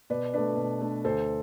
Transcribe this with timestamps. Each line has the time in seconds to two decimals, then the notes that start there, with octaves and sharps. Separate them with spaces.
0.10 B2 B4 D5
0.33 A3 D4 B4 D5
0.57 B2
0.81 A3 D4
1.05 D2 A4 C5